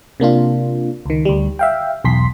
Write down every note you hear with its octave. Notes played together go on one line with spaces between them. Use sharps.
C3 A#3 D4 F4
C#2 D#3
D2 G3
E5 F5 G5
B1 E2 C6 B6